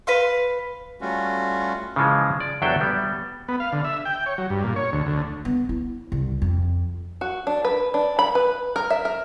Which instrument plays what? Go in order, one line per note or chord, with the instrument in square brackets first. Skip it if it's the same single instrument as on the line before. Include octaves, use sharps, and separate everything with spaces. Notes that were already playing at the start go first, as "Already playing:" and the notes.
[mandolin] B4 F5 C6
[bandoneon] G3 A3 C#4 F4 F#4
[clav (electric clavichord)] C#3 E3 F3 G#3
D5
E2 F#3 D4 G4 A4 G5
G3 B3
[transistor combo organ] B3
F5
D3
E5
G5
C#5
F#3
G2
A#2
C#5
D2
D2
[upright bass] B3
E4
C2
F2
[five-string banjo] F#4
D4
B4
D4
B5
B4
A#4
E5
A#4